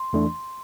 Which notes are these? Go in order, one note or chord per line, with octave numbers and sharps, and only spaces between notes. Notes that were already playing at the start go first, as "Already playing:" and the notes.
Already playing: C6
E2 E3 A3 D4